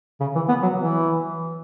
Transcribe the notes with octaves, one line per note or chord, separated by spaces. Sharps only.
C#3
E3
B3
F#3
E3